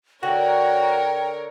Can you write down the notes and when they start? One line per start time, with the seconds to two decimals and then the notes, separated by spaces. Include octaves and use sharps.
0.23 D3 F#4 A#4 C#5 G5